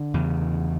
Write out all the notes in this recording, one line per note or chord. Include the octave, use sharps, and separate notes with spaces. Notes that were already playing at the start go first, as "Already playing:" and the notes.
Already playing: D3
E2 C#3